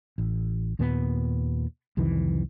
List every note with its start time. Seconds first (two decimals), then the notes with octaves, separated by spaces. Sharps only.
0.18 A1
0.79 D#2 A#2 A#3 B3
1.97 C2 F2 D#3 E3